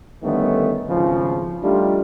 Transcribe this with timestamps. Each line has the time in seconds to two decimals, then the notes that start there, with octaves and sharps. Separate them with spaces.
0.22 D3 D#3 G3 A3 B3 C#4
0.87 G#1 C#3 F3
1.62 G3 A3 D4 D#4 F4 G4